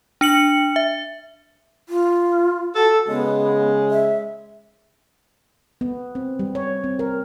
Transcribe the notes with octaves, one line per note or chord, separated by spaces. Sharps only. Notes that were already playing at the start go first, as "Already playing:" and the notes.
D4 C#7 F#7
E5
F4
F#4 A4
C#3 G#3 B3
E5
B3
C4
G3
C#5
C4
A#4